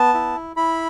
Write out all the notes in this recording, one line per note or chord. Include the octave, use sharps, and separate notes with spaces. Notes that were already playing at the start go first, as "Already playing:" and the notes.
Already playing: B3 A5
E4
E4 B5